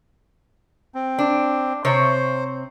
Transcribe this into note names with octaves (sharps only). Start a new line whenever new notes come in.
C4
D4
C3 C4 C5 C#5